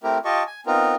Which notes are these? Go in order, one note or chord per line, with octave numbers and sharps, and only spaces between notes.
A3 C4 E4 G4 A#4
F4 G4 D#5 A5 C#6
G#5
B3 C4 D#4 F4 A#4